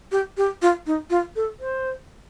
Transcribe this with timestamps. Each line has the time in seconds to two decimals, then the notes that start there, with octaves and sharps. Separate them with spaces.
0.12 G4
0.37 G4
0.62 F4
0.87 D#4
1.10 F4
1.36 A4
1.60 C5